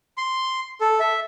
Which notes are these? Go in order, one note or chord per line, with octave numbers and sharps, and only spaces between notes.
C6
A4
E5